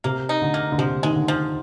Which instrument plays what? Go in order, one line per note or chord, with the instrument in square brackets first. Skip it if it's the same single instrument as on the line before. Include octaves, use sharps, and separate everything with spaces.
[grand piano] C3 [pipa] A#3
[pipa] D#4
[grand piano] D3
[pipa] A#3
[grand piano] D3
[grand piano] C3 [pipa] F3
[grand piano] D#3 [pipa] G#3
[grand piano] D3
[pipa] F3